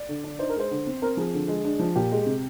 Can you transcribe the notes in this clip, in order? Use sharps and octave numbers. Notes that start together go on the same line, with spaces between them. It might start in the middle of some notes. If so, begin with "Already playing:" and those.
Already playing: D5
D3
D4
D#4 C5
A#4
G#3 C5
D3
C4
C4 A#4
F3 G#4
D3
G#3
D4
F3
A#2 G4
G#3
C3